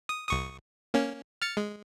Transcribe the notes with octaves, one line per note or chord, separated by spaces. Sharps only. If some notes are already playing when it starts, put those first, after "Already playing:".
D#6
C2 C#6 D#6
A#3 C#4
F6 A6 C#7
G#3